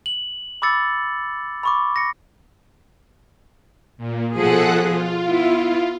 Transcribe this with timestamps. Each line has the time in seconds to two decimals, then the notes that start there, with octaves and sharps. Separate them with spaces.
0.06 F#7
0.62 B5 D6 E6 A6 C#7
1.63 B5 C#6 D6
1.96 A#6 C#7
3.98 A#2
4.36 B2 F3 G#4 A4 F#5 F#6
4.88 F4
5.25 B3 E4